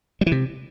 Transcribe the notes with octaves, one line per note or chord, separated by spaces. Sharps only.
G3
E3
C3